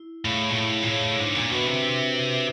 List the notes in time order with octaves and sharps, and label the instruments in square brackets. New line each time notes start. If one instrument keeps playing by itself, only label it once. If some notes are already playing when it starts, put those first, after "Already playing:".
Already playing: [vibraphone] E4
[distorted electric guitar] A2 [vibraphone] G#4 C#5 F5
[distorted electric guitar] A#2
[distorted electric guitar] A2 [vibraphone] E4
[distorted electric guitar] A#2
[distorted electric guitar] A2 [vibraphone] G#4 C#5 F5
[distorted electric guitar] G#2 [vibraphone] D4
[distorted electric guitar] A#2
[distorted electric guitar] B2 [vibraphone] F#4 B4 E5
[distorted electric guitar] C3
[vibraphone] D4
F#4 B4 E5